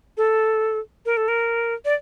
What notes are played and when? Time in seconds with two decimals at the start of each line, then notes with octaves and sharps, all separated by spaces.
0.17 A4
1.06 A#4
1.17 A4
1.28 A#4
1.85 D5